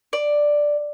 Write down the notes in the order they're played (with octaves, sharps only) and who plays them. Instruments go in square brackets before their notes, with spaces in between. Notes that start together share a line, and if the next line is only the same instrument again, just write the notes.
[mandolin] D5